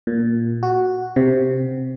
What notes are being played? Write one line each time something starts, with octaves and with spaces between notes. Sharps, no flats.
A#2
F#4
C3